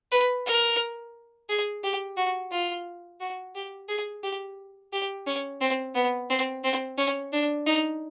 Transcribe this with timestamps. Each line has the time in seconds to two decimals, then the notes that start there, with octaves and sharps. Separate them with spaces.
0.12 B4
0.46 A#4
1.49 G#4
1.84 G4
2.17 F#4
2.52 F4
3.21 F#4
3.55 G4
3.89 G#4
4.24 G4
4.93 G4
5.26 C#4
5.61 C4
5.95 B3
6.30 C4
6.64 C4
6.98 C#4
7.33 D4
7.66 D#4